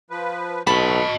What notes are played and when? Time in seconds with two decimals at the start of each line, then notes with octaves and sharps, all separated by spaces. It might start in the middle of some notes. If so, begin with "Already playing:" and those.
0.11 F3 B4
0.67 B1 D#5 A5 B5 C#6